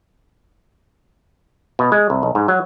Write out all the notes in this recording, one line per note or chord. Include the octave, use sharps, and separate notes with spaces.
B2
G#3
C2
B1
G#2
F#3